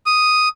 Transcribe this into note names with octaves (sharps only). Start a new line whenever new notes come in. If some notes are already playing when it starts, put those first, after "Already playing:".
D#6